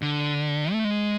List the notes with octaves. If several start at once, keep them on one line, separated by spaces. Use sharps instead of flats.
D3
A3
G#3